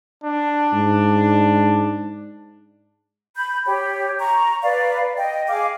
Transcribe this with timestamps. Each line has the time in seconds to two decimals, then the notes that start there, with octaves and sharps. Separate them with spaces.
0.24 D4
0.73 G#2
3.37 B5 G6
3.66 G4 C#5
4.20 A#5 C#6
4.63 B4 D5 F5
5.17 D#5 G5
5.48 G#4 F5 D6